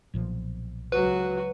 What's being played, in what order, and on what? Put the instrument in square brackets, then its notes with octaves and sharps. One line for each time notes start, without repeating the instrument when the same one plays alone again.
[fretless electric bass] B1 A#2 F3
[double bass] C#2 F#3 [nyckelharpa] F#4 [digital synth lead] B4